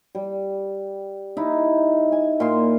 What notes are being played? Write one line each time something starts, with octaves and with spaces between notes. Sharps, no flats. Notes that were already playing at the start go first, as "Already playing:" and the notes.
G3
D#4 E4
G#5
A#2 C6